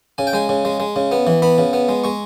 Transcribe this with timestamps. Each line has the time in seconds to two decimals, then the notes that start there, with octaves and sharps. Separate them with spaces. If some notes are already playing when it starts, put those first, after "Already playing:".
0.18 C#3 G#5
0.27 G5
0.33 G#3 G#5
0.49 C#3
0.65 G#3
0.80 G#3
0.96 C#3
1.12 B3
1.27 E3
1.42 B3 B5
1.58 C#3
1.73 B3
1.89 G#3
2.04 G#3 C#6